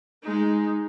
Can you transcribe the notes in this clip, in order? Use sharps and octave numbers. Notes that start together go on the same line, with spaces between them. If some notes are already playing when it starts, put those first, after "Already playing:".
G#3 D#4